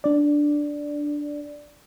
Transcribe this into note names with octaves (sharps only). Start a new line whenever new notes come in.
D4 D5